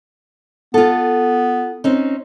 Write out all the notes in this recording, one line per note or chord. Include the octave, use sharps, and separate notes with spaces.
B3 F4 A4
C4 C#4 D#4